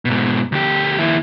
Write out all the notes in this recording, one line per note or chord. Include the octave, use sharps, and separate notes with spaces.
G#2 B2
D2 G4
D#2 E4